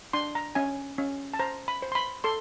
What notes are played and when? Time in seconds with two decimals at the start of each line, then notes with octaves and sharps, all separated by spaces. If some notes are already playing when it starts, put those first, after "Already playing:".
0.13 D4 C6
0.35 A#5
0.55 C#4 G#5
0.98 C#4
1.34 A5
1.39 C5 A#5
1.68 B5
1.82 C5
1.92 C6
1.95 B5
2.24 A4 C6